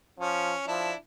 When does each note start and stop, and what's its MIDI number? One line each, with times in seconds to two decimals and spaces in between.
0.19 0.54 53
0.19 0.66 61
0.68 0.91 53
0.68 0.95 62
0.68 0.95 64